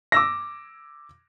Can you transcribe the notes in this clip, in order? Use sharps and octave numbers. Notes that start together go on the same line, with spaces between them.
D6 E6 A#6